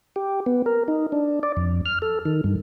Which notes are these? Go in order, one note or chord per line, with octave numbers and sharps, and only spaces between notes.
G4
B3
A#4
D#4
D4
D5
F2
F6
A4
D#3
G2